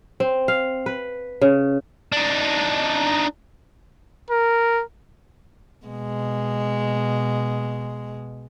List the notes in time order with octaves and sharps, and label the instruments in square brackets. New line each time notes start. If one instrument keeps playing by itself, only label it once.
[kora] C4
F5
B4
C#3
[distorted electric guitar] D4 D#4
[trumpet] A#4
[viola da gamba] B2 G#3